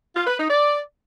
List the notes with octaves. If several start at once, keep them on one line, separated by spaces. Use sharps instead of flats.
F4
B4
D#4
D5